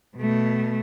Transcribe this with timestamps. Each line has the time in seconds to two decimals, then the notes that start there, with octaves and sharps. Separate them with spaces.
0.17 B2 A3